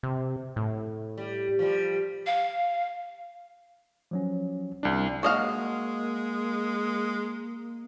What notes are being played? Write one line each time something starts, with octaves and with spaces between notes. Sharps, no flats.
C3
A2
G3
F3 G3
F5
F3 F#3 C#4
C2 D4
G#3 A#3 F#4 D#5 F5